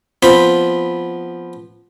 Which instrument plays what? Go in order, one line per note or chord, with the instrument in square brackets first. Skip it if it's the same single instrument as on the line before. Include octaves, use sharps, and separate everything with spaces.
[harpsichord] F3 B3 C4 C5 B5